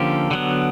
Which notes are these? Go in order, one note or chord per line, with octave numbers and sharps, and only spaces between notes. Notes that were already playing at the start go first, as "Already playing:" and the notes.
Already playing: D3 F3 A#3 C#4 G4 A4
D3 F#3 B3